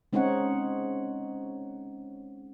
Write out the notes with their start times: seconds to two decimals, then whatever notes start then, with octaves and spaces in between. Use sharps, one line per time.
0.13 G#3 C4 C#4 D#4 C#5 F#5